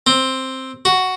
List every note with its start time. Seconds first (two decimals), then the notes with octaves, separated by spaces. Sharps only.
0.07 C4
0.85 F#4